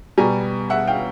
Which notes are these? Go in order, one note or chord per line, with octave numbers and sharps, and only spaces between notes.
B2 G3 G#5 A#5
E5 F#5
F5 G5